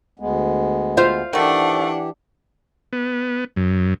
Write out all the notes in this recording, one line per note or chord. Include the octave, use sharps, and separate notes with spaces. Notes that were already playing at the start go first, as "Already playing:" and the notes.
D2 G#3 B3
F4 C5 E5
D#3 E3 A3 D4 G4 F#5
B3
F#2